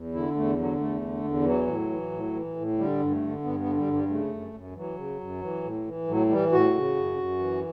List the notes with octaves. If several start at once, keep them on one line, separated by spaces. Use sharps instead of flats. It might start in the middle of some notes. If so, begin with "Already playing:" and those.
Already playing: E2
D3 E4
E2 A3
D3 F#3
E2 A3
D3
E2
E3 F#3
A2
E3
A2
E3
A2
D3 G3
G2
A3
D3
G2 B3
B3
D3
G3
G2
G3
C#3 A3
F#2
F#2
E3 F#3
C#3
F#2
E3
A2
E3
A2 F#3
E3 G3
A2 F#4
C#3
F#2
F#2
E3